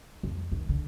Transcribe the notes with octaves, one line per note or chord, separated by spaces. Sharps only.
F2
D#3
D3